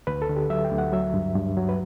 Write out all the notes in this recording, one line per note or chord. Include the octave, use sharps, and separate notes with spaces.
D2 B4
A4
D3
G4
F#3 E5
G5
D2
F#5
F#3 E5
G2
G2
F#3
B4